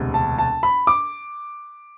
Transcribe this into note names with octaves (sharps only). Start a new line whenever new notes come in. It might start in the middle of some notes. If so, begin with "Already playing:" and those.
Already playing: E1 D2 C3
A5
A5
B5
D6